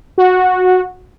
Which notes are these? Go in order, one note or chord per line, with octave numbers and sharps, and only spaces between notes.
F#4